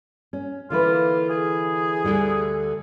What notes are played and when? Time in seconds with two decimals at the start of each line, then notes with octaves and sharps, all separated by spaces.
0.33 C#4
0.70 D3 E3 A#3 F4 B4
1.29 G#4
2.04 D2 D3 G3